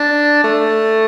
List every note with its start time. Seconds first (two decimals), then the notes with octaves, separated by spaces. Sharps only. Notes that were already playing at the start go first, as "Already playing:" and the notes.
Already playing: D4
0.44 A3